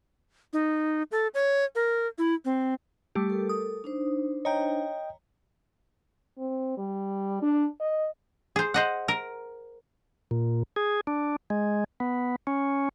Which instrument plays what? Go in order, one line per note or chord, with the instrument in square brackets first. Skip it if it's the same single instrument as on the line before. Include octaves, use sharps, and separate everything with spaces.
[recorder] D#4
A4
C#5
A#4
E4
C4
[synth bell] G3 A3 G4
[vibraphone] A4 A#4
[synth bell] D#6
[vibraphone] D4 D#4 C5
[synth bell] C#5 A#5 [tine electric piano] D#5 G5
[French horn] C4
G3
D4
D#5
[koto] G#4 C5
C5 D#5 F#5
A#4
[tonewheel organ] A#2
G#4
D4
G#3
B3
C#4